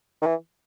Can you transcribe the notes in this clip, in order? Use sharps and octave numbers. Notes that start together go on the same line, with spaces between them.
D#3
E3